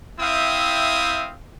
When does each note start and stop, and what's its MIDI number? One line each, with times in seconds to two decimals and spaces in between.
0.20 1.33 60
0.20 1.33 64
0.20 1.33 76
0.20 1.33 77
0.20 1.33 79
0.20 1.33 87